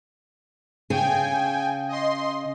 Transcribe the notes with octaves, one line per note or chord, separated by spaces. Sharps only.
C#3 G#4 G5 G#5
D#5 C6